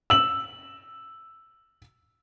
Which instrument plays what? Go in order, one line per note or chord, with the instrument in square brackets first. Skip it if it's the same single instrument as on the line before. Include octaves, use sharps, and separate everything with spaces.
[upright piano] E6 F#7